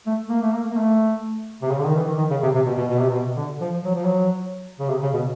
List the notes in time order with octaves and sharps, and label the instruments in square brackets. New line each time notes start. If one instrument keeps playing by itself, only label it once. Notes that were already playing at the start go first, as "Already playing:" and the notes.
[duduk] A3
A#3
A3
A#3
A#3
A3
C3
C#3
D3
D#3
E3
D#3
D#3
C#3
C3
C3
B2
B2
B2
C3
B2
D3
F3
F#3
F3
F#3
C#3
C3
C#3
B2